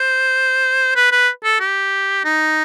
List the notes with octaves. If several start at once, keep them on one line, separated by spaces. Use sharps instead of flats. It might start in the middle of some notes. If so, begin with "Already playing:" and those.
Already playing: C5
B4
B4
A4
G4
D#4